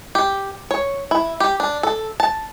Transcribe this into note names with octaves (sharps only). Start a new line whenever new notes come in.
G4
C#5
E4
G4
D4
A4
A5